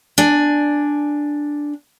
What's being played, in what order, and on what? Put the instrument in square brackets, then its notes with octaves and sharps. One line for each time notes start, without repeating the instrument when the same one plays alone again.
[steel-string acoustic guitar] D4 G#5